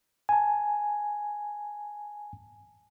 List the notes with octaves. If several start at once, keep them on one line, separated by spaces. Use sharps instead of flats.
G#5 A5